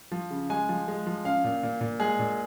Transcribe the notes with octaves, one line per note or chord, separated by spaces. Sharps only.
F3
C#3
G#3 G#5
F3
G#3
F3
C#4 F5
A#2
A#2
A#2
G#3 G#4
A#2